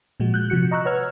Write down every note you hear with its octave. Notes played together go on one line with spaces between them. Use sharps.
A#2 F3 G#3 F#4
F#6 G6
C3 F3 F#4 C#7
D#5 A#5 C#6 E6 F#6
B4 C#5 F#5 E6 F6 G#6